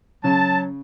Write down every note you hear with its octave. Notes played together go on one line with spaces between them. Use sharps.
C#3 F#3 A5